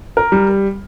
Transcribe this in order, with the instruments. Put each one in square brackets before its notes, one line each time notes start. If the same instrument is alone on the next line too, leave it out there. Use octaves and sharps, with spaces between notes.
[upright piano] A#4
G3